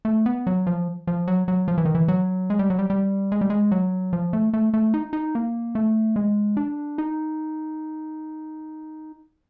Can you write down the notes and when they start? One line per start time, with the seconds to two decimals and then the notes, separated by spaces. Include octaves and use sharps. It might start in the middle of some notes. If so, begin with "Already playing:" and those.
0.05 A3
0.26 B3
0.47 F#3
0.67 F3
1.07 F3
1.27 F#3
1.48 F#3
1.68 F3
1.78 E3
1.85 D#3
1.95 E3
2.08 F#3
2.50 G#3
2.59 G3
2.70 F#3
2.79 G3
2.90 G3
3.32 G#3
3.41 G3
3.50 G#3
3.71 F#3
4.13 F3
4.33 A3
4.53 A3
4.74 A3
4.94 D#4
5.13 D#4
5.35 A#3
5.75 A3
6.16 G#3
6.57 D4
6.98 D#4